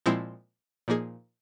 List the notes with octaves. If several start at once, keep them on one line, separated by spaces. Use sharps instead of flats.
A#2 F3 G#3 C4 E4
A#2 F3 A#3 D#4 G#4